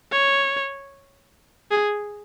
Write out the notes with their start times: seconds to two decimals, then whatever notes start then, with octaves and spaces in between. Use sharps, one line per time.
0.12 C#5
1.71 G#4